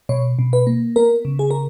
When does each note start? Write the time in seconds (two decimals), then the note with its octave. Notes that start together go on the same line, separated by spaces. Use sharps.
0.09 B2 C#5
0.39 B2
0.53 B4
0.67 A#3
0.96 B3 A#4
1.25 C#3
1.39 G#4
1.51 A#4